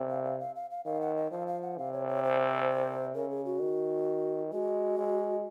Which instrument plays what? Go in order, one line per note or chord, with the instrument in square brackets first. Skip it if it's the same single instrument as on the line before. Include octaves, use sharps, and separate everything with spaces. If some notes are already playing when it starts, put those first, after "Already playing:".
Already playing: [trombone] C3
[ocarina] F5
F5
F5
F5
F5
[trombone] D#3 [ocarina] F5
[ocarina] F#5
D#5
[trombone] F3 [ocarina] F5
[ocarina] F5
F#5
[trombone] C3 [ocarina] F5
[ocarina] C#5
C#5
C5
[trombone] C#3 [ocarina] A#4
[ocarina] G#4
F#4
[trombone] D#3
[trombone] G#3 [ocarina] F#4
[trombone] G#3